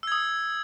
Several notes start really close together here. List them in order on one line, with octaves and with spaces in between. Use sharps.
E6 G#6 D#6